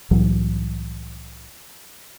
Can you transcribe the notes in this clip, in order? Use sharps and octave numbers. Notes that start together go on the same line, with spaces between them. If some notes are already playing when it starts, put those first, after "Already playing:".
C2 A2 E3 F#3